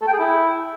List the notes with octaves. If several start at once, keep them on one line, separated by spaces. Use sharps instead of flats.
A4
G5
G#4
E4